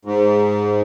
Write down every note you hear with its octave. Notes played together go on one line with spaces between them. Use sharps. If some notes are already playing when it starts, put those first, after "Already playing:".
G#2